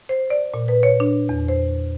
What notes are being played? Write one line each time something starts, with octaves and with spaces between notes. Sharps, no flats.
C5
D5
A#2
B4
C#5
D4
E2
C5